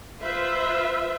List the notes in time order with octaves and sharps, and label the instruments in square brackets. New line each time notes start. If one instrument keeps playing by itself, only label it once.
[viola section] F4 B4 C5 E5